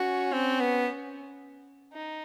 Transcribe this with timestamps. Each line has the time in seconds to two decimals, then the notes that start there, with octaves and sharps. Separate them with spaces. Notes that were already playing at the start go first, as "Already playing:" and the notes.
Already playing: C#4 F#4
0.33 C4
0.60 B3
1.93 D#4